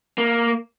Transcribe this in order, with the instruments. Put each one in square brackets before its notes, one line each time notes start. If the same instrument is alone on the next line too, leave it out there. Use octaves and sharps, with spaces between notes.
[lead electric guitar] A#3